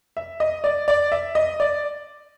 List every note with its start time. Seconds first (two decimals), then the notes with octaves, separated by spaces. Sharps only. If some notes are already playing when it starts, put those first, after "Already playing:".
0.17 E5
0.40 D#5
0.64 D5
0.88 D5
1.12 E5
1.35 D#5
1.60 D5